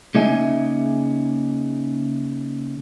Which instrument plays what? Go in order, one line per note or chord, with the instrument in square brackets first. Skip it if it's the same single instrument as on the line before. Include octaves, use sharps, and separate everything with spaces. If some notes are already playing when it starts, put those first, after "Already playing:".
[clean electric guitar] C#3 A#3 D#4 D#5 E5 G#5